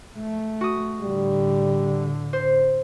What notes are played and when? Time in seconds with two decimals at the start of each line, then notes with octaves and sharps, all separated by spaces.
0.18 A3
0.61 F#4 D#6
1.01 A2 D3 G3
2.33 C5